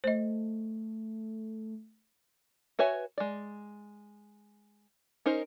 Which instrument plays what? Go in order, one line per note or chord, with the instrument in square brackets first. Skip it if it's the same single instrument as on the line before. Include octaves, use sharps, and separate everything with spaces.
[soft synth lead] A3 [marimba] C5 D#5
[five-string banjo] F#4 B4 C#5 E5 G#5
G#3 D5
C#4 D#4 A#4 C5